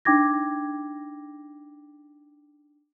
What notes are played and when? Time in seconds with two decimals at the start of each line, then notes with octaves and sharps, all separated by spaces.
0.05 D4 D#4 G5 D6 G#6 A#6